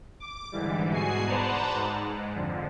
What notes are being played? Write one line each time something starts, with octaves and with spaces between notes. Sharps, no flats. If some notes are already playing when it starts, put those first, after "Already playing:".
D6
G#2 D3 E3 G3
G#2 B2 F#4 G#4 G#5 C7
B4 C5 D5 F#5 A5 A#5
G#2
F2 D3 F3